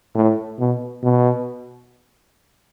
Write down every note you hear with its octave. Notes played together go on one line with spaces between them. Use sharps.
A2
B2
B2